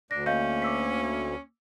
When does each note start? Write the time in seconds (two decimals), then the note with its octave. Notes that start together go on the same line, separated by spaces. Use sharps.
0.11 D2 D4 A#6
0.26 A#3 C#4 D#5 F5 G6
0.62 D6 E6 B6